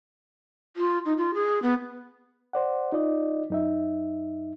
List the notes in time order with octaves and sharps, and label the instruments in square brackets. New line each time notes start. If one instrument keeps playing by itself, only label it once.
[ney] F4
D#4
F4
G#4
B3
[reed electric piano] C5 D5 F#5
D#4 F4 D5 D#5
F#2 D#4 E5